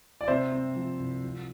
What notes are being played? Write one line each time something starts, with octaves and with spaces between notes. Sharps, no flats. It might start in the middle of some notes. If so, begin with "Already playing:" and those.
D5
C3 C5 E5
C4
F3
C2
F3